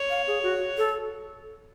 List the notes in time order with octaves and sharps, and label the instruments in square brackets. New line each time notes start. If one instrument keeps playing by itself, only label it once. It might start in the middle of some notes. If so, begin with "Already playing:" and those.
Already playing: [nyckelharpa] C#5
[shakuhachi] F5
G#4
F#4
A4